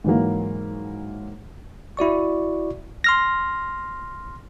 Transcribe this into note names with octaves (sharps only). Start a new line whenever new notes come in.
G#2 E3 F#3 A#3
E4 F#4 D5 C#6
C6 F6 A#6